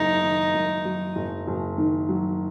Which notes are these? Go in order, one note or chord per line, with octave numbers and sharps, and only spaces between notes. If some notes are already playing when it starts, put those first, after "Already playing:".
Already playing: F#1 F#2 F#3 D#4
D#3
F#2
F#3
F#1
F#1
D#3
F#3